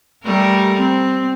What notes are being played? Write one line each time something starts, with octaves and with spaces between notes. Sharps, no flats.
G3 A3 A#4
C4